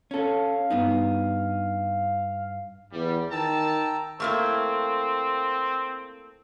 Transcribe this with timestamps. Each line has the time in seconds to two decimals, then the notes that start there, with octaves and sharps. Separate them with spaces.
0.11 C#4 A4 F5
0.70 G2 B3 D#4
2.92 E2 G3
3.31 D#3 G5 A5 A#5 E6
4.20 A3 A#3 C4 E4